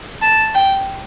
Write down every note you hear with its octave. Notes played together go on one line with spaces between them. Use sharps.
A5
G5